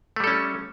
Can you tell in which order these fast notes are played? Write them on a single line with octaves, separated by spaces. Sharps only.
A3 G3 A4 C#4